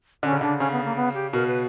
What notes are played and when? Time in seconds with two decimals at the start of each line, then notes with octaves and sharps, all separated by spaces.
0.23 D3 C#4
0.32 C#3
0.41 D3 D4
0.60 C#3 C#4
0.72 B3
0.85 A#3
0.96 B3
1.15 G4
1.33 B2 A#4
1.46 B4